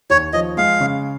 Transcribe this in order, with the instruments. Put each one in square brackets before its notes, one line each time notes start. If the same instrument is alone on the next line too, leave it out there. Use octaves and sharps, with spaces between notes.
[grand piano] D#2 [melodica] C#5
[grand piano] F3 [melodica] D#5
[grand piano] G#3 [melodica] F5
[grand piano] C#3